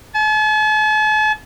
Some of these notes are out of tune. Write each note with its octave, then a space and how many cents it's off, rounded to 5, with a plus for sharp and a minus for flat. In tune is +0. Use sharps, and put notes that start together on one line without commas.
A5 -45